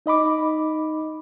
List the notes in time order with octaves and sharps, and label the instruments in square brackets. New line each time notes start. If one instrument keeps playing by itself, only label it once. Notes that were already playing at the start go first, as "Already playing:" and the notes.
[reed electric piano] D#4 D#5 B5 D6